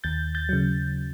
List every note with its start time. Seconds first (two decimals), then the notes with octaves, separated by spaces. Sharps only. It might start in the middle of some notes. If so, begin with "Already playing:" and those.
0.04 D#2 G6 A6
0.35 G6 A6
0.49 C#3 F#3